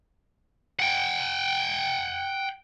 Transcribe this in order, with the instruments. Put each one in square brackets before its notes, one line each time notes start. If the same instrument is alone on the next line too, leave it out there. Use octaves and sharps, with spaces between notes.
[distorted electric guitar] F#5 G5